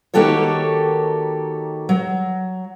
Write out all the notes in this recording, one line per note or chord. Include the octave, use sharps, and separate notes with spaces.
D#3 A#3 F#4 G4 A4 C#5
F#3